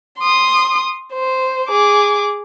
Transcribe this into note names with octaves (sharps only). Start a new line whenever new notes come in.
C6 D#6
C5
G#4 D6